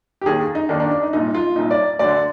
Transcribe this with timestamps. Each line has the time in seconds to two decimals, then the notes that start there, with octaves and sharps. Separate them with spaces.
0.21 G4
0.26 D#2 D#3 G#4
0.55 D#4
0.69 D#2 D#3 D4
0.80 D4
0.91 D4
1.02 D#4
1.13 C2 A#2 D#4
1.35 F4
1.55 C2 A#2 D#4
1.71 D5
1.99 D2 D3 D5